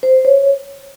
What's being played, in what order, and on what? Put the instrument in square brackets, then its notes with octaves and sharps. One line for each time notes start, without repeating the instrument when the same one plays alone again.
[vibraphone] C5
C#5